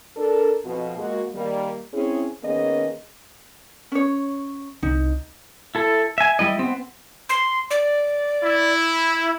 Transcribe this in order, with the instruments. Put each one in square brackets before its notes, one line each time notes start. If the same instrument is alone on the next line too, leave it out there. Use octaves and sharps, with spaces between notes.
[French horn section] D4 A4 A#4
F2 B2 F4
G#3 A#3 F#4
D#3 G3 A#3
C4 C#4 E4 G#4
D#3 A#3 B3 C#4 G#4 D#5
[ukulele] C#4 C#5
[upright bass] C2 [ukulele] D#4
[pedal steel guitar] E4 A4
E5 G#5
G3 E4 D#5
B3 C4
[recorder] C6
D5
[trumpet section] E4